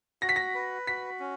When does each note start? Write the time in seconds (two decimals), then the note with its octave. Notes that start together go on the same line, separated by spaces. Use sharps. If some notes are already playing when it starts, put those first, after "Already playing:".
0.22 F#4 A#6
0.29 B6
0.36 A#6
0.54 B4
0.87 F#4 B6
1.20 C#4